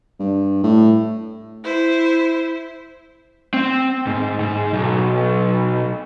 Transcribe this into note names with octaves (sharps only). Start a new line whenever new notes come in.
G2
A2
E4 C5
C4
G#2
G#2
B1